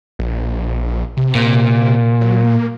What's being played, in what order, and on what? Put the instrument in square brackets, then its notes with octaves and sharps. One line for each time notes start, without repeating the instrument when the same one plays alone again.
[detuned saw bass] A#1
C3
[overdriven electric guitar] A#2
[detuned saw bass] F#3
A#3